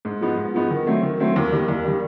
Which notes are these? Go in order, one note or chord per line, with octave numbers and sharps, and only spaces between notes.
G#2
F3 G#3 B3 D#4
G#2
F3 G#3 B3 D#4
D#3
F#3 A3 C4
D#3
F#3 A3 C4
D#2
D#3 G3
D#2
D#3 G3